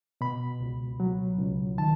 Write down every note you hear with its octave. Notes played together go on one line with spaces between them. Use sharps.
B2 B5
C#2
F#3
C#2
D#3 A5